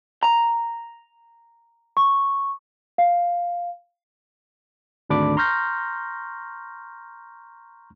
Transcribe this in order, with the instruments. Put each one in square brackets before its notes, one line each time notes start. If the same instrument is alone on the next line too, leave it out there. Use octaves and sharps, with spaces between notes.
[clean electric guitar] A#5
[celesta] C#6
F5
[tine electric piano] G#1 D2 D4 B5 D6
A#5 C6 C#6 F6 G6 A#6